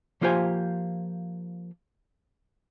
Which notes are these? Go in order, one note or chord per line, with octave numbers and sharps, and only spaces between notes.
F3 A#3 F4 G4 C5 G#5